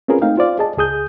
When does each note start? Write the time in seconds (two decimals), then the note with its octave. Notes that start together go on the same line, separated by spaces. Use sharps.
0.08 C4 C#4 F4 G#4 A#4 B4
0.22 A3 C4 D#4 F5 G5
0.37 F4 C5 D5 F5
0.59 G#4 D#5 A5
0.77 C#2 G#4 D#6 G6